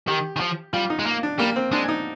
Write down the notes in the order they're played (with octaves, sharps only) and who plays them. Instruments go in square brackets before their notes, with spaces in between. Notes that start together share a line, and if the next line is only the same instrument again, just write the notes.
[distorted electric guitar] D#3 [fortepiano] G4
[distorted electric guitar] D#3
F3
[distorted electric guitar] G3 [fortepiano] F4
[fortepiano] D#4
[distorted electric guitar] G#3
A#3
[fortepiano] D4
[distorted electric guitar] G3 [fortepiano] A#3
[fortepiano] C4
[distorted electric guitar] G#3 [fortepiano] D4
[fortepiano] D#4